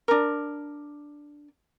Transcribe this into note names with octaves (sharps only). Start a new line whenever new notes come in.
D4 A#4